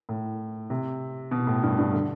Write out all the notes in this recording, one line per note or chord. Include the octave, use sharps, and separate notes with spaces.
A2
C3
B2
A2
G2
G2
D3